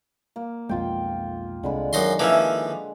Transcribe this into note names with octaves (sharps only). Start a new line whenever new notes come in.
A#3
B1 F2 G#3 F4 G5
C2 D3 G#3 B5
F#2 D#3 D#5 C6
E3 F3 A#3 C#4 E5